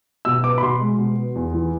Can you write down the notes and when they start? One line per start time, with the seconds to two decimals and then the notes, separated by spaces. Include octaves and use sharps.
0.25 B2 E6
0.44 B3 D6
0.58 B5
0.63 B2 C6
0.81 G#3
0.98 B2
1.18 B3
1.35 E2
1.54 E3